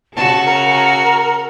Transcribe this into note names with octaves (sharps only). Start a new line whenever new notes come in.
C#3 F#4 A4 A5
A#4